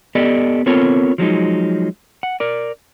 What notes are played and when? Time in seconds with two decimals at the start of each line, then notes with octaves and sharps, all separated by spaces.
0.15 B3 G4 A4 D5 D#5
0.66 B3 C4 F4 A4 A#4 C#5
1.18 F3 F#3 G#3 D#4
2.23 F#5
2.40 A#4 D5